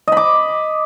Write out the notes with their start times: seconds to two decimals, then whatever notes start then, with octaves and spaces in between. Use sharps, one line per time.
0.08 D#5
0.12 B5
0.17 D6